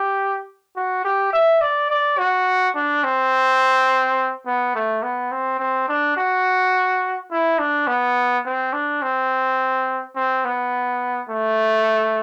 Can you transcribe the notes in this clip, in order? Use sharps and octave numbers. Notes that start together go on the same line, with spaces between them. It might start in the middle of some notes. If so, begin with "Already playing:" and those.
Already playing: G4
F#4
G4
E5
D5
D5
F#4
D4
C4
B3
A3
B3
C4
C4
D4
F#4
E4
D4
B3
C4
D4
C4
C4
B3
A3